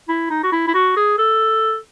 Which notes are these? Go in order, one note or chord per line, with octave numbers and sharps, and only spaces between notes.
E4
D#4
F#4
E4
E4
F#4
G#4
A4